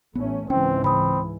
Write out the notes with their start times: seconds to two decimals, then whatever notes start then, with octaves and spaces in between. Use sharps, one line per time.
0.15 A1 A3 B3 C#4
0.50 C#2 G#2 E3 C4 C#4 G5
0.84 C#3 C4 B5 D#6